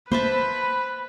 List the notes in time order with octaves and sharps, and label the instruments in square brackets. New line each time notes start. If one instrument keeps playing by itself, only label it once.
[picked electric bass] A#3 [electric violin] B4 [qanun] C5 E5 A5 [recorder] B5